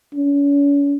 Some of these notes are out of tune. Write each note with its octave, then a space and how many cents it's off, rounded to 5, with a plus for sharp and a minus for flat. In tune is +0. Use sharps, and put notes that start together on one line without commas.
C#4 +40